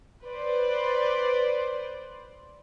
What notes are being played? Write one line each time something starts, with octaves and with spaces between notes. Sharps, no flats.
B4 C5 D5